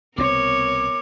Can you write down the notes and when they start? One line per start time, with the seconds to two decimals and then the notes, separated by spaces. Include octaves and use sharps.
0.18 C2 B2 B3 C4 A#4 C#5 D6